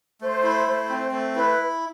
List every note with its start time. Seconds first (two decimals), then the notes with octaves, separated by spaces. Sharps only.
0.21 A3 C5
0.43 E4
0.67 A3 C5
0.89 C4
1.12 A3
1.35 E4 B4